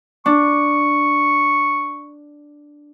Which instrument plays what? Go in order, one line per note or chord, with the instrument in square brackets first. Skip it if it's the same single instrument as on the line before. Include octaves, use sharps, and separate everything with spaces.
[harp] D4 [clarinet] C#6